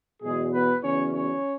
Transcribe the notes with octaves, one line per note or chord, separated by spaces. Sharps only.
E2 B2 F#3 G#3 G#4
B3 B4
E2 C#3 F#3 C#4 C#5
C#4 C#5